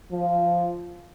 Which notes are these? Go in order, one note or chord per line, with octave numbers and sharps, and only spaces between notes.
F3